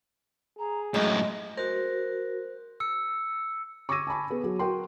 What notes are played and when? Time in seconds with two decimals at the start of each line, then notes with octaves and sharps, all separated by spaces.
0.59 G#4 A#5
0.94 F#2 A2 G#3 D#5
1.57 F#4 A#4 C5
2.80 E6 C#7
3.89 C#6 D6 E6 G#6 A#6 D#7
4.07 G#5 A5 B5 C#6
4.30 B3 G#4
4.44 F#3 G#4
4.59 F#4 A#4 G5 C6